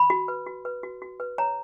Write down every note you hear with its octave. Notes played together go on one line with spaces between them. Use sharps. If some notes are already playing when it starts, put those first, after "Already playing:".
Already playing: B5
F#4
B4
F#4
B4
F#4
F#4
B4
C#5 A#5